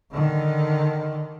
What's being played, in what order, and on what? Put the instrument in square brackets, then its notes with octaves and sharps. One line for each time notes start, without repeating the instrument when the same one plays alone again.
[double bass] D3 D#3